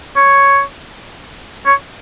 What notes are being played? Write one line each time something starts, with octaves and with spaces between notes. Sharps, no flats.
C#5
C#5